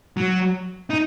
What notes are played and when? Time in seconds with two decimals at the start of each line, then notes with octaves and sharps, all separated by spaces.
0.17 F#3
0.90 D#4